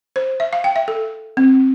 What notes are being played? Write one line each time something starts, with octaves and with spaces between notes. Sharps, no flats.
C5
E5
F5
G5
E5
A4
C4